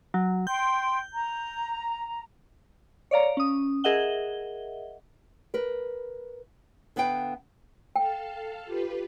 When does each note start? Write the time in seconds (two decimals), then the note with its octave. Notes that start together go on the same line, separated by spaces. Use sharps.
0.14 F#3
0.47 G5 C6 G6
1.13 A#5
3.11 C#5 D5 F5 A#5
3.37 C#4 D#6
3.84 G#4 A#4 D#5 E5 F#5 G7
5.54 A#4 B4
6.96 D3 B3 B4 F5 G5
7.96 A4 F5 G5 A5
8.65 F4 G4 B4